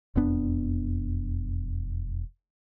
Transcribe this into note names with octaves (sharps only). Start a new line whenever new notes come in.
E1 F2 B3 D4